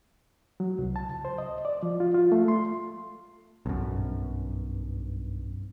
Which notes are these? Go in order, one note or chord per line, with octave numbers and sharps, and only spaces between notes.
F#3
C2
A5
C#2
C5
D#5
D5
F3
F4
F4
A3
C6
B1 F#2
G2